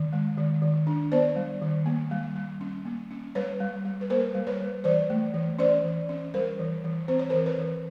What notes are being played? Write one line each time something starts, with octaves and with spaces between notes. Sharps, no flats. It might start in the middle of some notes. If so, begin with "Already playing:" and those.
Already playing: D#3
G#3
D#3
D#3
D4
B3 C5 D5
G3
D#3
A#3
G3
G3
C#4
A#3
C#4
G3 B4 C#5
G3
G3
B4
A#3 A#4 C5
G3
B4 C#5
G3
E3 C5 D5
A3
E3
C#4 C5 D5
E3
C#4
G3 A#4 C5
E3
E3
C4 C5
C#5
E3 A#4 C5
B4 C#5
E3